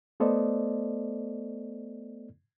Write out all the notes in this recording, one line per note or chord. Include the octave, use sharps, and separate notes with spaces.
A3 B3 A4 C5 D5 D#5